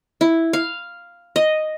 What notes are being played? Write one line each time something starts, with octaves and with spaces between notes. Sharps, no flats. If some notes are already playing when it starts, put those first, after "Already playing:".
E4
F5
D#5